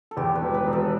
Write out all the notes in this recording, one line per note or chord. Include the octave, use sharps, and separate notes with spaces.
A4
E2 G4
B4
E1
B4
E1
A4